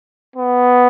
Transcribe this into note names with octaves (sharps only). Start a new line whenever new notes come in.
B3